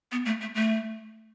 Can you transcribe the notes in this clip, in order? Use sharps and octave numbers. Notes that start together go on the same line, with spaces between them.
B3
A3
A3
A3